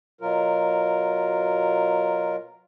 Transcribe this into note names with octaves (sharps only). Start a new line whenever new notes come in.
B2 F#3 F4 A#4